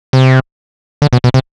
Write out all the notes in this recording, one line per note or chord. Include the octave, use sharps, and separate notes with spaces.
C3
D3
B2
B2
C3